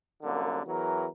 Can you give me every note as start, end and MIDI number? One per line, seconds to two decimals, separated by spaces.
0.23 0.59 36
0.23 0.59 42
0.23 0.59 50
0.23 0.59 58
0.65 1.06 40
0.65 1.06 52
0.65 1.06 54
0.65 1.06 70